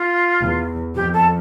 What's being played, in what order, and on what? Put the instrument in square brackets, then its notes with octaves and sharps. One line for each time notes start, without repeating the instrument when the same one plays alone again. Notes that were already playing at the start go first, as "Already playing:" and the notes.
Already playing: [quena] F4
[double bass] E2
[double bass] F2 [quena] G4
[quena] A4